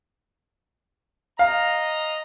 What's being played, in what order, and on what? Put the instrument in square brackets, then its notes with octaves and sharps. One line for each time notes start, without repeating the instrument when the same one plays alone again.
[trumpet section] D#5 A#5 [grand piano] F5